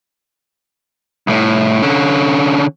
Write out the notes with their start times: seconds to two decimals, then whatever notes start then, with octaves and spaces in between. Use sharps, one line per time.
1.27 C2 A2
1.82 D3 C#4